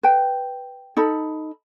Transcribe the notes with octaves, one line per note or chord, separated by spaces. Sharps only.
B4 G5
D#4 A4 B5